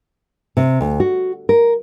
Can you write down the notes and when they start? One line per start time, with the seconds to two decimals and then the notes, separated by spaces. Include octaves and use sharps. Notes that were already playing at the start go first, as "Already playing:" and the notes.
0.57 C3
0.81 D2
1.00 F#4
1.49 A#4